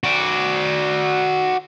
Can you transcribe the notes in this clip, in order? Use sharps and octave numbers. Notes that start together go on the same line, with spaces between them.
F#4 D5